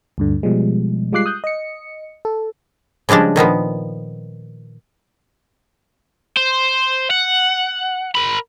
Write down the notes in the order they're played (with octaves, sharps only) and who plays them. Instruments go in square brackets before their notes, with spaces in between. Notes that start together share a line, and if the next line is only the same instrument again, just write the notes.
[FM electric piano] D2 G2 D3
B2 F3 G3 G#3
G3 G#3 F4 D6 F#6 C7
D#6 F#6 G6
D#5 C#7
A4
[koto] C#3 F3 G3 G#3 D4
A#2 D#3 F3 B3
[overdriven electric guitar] C5
F#5
A#4 B5